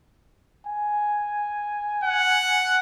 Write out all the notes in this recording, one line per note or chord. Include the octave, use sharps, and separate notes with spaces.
G#5
F#5